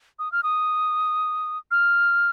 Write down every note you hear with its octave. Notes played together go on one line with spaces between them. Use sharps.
D#6
F6
D#6
F6